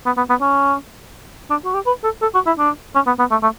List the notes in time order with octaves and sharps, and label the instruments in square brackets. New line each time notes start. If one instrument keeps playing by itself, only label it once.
[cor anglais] B3
B3
B3
C#4
D4
F#4
G4
B4
A4
A4
F#4
E4
D4
C#4
B3
B3
A3
A3